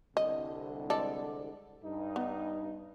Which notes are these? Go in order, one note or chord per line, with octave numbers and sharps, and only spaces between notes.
C2 D3 D#5
G#3 A4 D5
G2 D#4
B3